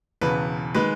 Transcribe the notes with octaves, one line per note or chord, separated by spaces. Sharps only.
E1 E2 C#3 B4
D#3 G#3 B4